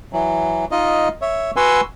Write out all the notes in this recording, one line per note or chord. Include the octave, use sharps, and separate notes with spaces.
E3 F#3
D#4 F4 D#5
C#5 E5
F#4 B4 F#5 G#5 C6 E6